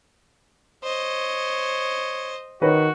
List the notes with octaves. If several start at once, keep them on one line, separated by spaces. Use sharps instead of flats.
C5 C#5 D#5
D#3 F#4 B4 C#5